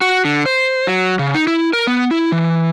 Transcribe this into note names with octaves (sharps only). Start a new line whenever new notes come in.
F#4
D3
C5
F#3
C#3
D#4
E4
A#4
B3
E4
E3